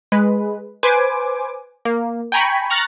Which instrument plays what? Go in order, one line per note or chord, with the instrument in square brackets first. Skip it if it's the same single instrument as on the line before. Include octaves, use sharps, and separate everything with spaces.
[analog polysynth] G#3 B4
B4 C5 G#5 D6
A#3
G5 G#5 A#5 B5 C#6
A#5 C#6 F6 F#6 A6 A#6